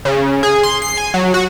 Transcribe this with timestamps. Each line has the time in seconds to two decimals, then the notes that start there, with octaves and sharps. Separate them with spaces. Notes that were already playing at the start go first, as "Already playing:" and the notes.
0.05 C#3
0.43 G#4
0.63 C6
0.82 C7
0.97 G#5
1.14 F#3
1.34 F#4